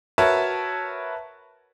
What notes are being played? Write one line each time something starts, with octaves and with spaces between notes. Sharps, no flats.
F#4 A#4 B4 C#5 E5 A5